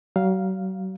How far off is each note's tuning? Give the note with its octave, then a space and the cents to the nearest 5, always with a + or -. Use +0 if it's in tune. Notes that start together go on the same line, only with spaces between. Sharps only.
F#3 +40 F5 +0